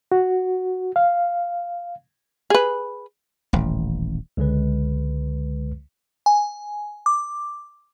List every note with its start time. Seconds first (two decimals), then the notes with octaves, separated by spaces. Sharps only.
0.12 F#4
0.96 F5
2.50 G#4 B4
3.53 D#1 A1
4.37 C#2 D3 G#3 B4
6.26 G#5
7.06 D6